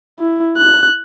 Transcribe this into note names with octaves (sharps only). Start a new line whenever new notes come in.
E4
F#6